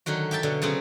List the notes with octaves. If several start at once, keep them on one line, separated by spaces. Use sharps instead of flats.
D3 D#3 F#3 F#4
G4 E5 G5 A5
B2 D3 F#3
C#3 F#3 B3 C4